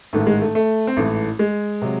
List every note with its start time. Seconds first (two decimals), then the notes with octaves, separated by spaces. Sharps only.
0.13 A1 G#2 D#3 A3
0.27 G#3
0.41 A3
0.55 A3
0.87 C4
0.97 A1 G#2 E3 A3
1.39 G#3
1.82 C3 F#3